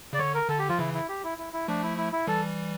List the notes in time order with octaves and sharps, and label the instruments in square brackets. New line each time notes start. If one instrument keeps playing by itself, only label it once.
[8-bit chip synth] C#3 [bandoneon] D5
[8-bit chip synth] D3 [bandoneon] C#5
[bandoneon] A#4
[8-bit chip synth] D3 [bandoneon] A4
[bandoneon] G4
[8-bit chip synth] F3 [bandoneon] F4
[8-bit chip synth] C#3 E3 [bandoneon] E4
[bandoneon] E4
G4
E4
E4
E4
[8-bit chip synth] F3 A3 [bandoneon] D4
[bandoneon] E4
E4
E4
[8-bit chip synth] E3 G3 [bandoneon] A4